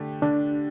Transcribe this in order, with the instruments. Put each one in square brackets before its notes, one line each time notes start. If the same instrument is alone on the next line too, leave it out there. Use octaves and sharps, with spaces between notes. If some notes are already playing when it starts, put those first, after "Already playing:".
Already playing: [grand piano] D3 A3 G4
[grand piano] D3 [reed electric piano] D4